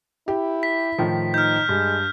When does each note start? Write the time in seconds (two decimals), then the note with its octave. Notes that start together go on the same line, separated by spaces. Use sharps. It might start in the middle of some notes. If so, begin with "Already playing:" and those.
0.28 E4 G4
0.63 B6
0.98 A2 D#3 F3
1.34 D#4 F6 G6
1.69 G2 G#3